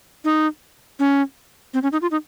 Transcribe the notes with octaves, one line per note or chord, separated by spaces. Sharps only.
D#4
C#4
C4
C#4
D#4
F4
D#4